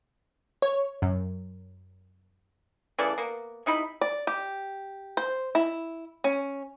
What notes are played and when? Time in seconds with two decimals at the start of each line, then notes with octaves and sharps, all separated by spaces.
0.62 C#5
1.02 F#2
2.98 C#3 E3 A3 D5
3.18 A#3 B3
3.66 C3 D#4 E4 B5
4.01 D5
4.27 G4
5.17 C5
5.55 E4
6.24 C#4